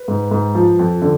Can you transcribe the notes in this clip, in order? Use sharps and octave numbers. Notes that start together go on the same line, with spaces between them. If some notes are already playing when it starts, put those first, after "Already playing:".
Already playing: B4
G#2
G#2
F3
F2
D3